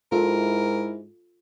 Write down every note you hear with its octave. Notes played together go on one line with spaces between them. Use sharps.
G#2 E4 F4 A4 A#4